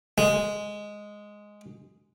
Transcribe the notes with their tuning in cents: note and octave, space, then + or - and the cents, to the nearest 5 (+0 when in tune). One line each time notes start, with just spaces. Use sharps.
G#3 +0